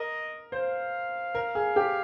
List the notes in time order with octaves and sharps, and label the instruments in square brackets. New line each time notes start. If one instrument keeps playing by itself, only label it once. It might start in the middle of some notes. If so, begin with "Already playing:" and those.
Already playing: [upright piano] A#4 [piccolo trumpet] D#5
[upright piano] C5 [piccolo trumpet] F5
[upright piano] A#4
G#4
G4